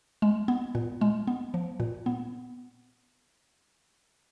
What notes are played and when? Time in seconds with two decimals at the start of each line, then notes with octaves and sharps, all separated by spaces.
0.22 G#3
0.48 B3
0.75 A#2
1.01 G#3
1.27 B3
1.54 F3
1.80 A#2
2.06 B3